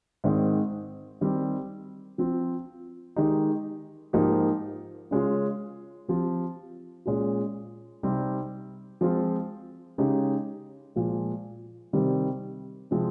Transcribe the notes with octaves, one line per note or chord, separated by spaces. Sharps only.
G#2 D#3 G#3 C4
D#3 G3 C4 G4
F3 C4 F4
D#3 G#3 D#4 G4
G#2 F3 A#3 D#4 G4
C#3 G#3 C#4 F4
F3 C4 G4
A#2 G#3 C#4 F4
C3 G3 C4 D#4 G4
F3 G#3 C4 F4
C#3 G#3 D#4 G4
A#2 F3 G#3
C3 D#3 G3 C4 G4
C3 F3 G#3 C4